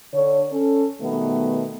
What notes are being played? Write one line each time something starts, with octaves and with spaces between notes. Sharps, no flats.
D3 C#5
C#4 A4
B2 D#3 G3 A3 B3